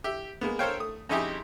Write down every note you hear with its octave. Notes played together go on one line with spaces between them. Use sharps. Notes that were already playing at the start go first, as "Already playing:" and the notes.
G4 E5
G#3 A#3 B3
A4 A#4 C5 C#5 F5 G5
A3 D#6
F2 C#4 D#4 E4 G4 G#4